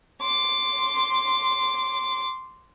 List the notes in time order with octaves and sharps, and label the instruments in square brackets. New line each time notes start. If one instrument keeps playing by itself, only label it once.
[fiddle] C6 D6